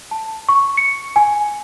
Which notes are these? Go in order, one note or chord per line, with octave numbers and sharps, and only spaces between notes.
A5
C#6
C#7
G#5